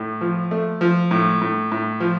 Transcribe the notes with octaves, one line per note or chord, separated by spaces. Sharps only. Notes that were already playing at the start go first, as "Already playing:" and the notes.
Already playing: A2
F3
A3
F3
A2
A2
A2
F3